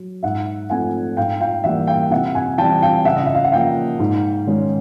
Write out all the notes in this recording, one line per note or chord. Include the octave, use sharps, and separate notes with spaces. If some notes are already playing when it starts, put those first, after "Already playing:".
Already playing: F#3
G#2 E5 F#5
F3 A3 C4 F#5 G#5
G#2 F5 G5
F5 G5
E3 G3 A#3 E5 F#5
F5 G5
C3 E5 F#5
F#5 G#5
E3 G3 C4 G5 A5
F5 G5
C#3 E5 F#5
D#5
E5
F5
F#5
F3 A#3 F5 G5
G#2
D#3 G#3 C#4